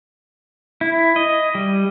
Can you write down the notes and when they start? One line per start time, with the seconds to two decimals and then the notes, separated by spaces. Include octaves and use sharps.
0.81 E4
1.16 D#5
1.55 G3